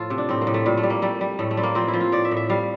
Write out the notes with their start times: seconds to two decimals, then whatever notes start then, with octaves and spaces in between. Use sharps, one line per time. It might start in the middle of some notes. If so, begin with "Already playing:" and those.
Already playing: A2 F3 F4 A4
0.10 C3
0.18 D4
0.29 A2 C4
0.41 A#3
0.47 A2
0.54 A3
0.66 A#2 G3
0.77 A3
0.83 G3
0.90 A#3
1.02 G3 A3
1.21 G3
1.39 A2 A3
1.51 A3
1.57 G3 C4
1.63 A#3
1.75 F3 C4
1.88 E4
1.94 F3
2.00 F4
2.12 A2 D5
2.25 E5
2.31 A2
2.37 E5
2.50 G3 F5